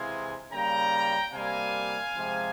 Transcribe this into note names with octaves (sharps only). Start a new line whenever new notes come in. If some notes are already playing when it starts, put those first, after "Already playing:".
Already playing: C3 E3 G#3 F5 G#5
C#3 G3 A#3 G5 A#5
C3 G3 A#3 F5 G#5
C3 F3 G#3